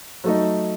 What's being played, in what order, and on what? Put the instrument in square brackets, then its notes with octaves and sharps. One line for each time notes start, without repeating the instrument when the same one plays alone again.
[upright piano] F#3 A3 D#4